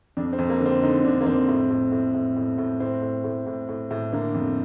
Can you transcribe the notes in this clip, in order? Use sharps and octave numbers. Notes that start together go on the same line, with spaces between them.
F2 D4
C4
F2
A#3
D3
C4
D3 D#4
D3 D4
A#3
F2 C4
A2
A2
A2
A2
A2
A2
A2 C4
A2
A2
A2
A2
A2
D3 A#3
F2